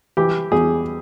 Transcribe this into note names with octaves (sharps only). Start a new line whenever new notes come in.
E3 G4
E2 G#4